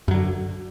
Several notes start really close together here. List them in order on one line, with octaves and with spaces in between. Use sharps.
F#2 F#3 D3